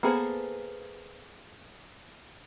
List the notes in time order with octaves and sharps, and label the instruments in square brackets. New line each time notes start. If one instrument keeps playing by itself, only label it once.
[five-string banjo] A#3 B3 G#4 A4 C5